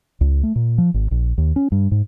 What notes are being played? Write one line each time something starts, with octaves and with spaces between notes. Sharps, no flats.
C#2
A3
A#2
F3
G#1
A#1
D#2
C#4
G2
G#2